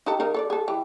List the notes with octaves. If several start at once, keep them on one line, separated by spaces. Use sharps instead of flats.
D#4 G4 A4
C#3 D#4 A#4
A4 C#5 D5
G#4 A4
E3 G4